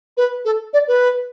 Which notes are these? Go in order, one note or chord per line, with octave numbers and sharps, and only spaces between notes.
B4
A4
D5
B4